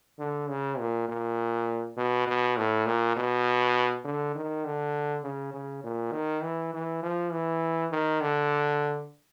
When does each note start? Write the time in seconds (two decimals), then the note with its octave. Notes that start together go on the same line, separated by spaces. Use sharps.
0.19 D3
0.49 C#3
0.79 A#2
1.09 A#2
1.97 B2
2.27 B2
2.57 A2
2.86 A#2
3.16 B2
4.05 D3
4.35 D#3
4.65 D3
5.24 C#3
5.53 C#3
5.84 A#2
6.13 D#3
6.42 E3
6.73 E3
7.03 F3
7.32 E3
7.92 D#3
8.21 D3